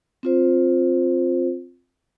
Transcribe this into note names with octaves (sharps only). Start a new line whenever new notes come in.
C4 F4 C5